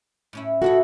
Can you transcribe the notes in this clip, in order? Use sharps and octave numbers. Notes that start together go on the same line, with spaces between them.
A2 C#4 E4
A2 C#3 E4 F#4 A4